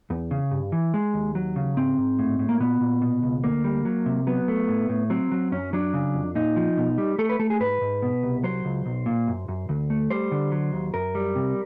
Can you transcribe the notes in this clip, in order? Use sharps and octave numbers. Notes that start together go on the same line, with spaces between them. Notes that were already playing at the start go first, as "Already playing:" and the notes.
E2
C#3
G2
E3
G#3
D#2
F#3
C#3
G#2 C4
G#2
A2
A2
A#3
A#2 B3
A#2
B2
C#2
D2 A#3
G3
F#3
C3
F#3 B3
A3
A2
A2
F#3 C4
F#3
F#2 C#4
F#3 D4
C#3
F2
A#2 D#4
F3
B2
G3
A3 A4
B4
A3 A4
G#4
G#2 B4
G#2
B2
C2
F#3 C5
C#2
B1
A#2
F#2
F#2
D2
A3
G3 C5
D3
F#3
D#2
F#2 A#4
G3
C3